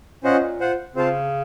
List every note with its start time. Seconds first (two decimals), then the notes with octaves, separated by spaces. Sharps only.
0.24 A#2 C#4 F4 C5 D#5 F#5
0.60 F4 C5 F#5
0.95 C#3 C4 F4 C5 F5 A5